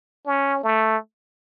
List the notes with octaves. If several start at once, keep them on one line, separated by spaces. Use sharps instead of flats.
C#4
A3